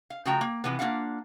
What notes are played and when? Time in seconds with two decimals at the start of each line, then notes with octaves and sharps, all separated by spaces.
0.10 F5
0.25 C#3 F3 A3 F#4 G5 A#5
0.41 A#3
0.64 C3 E3 F3 B3
0.79 A#3 C#4 D4 F4 F5 F#5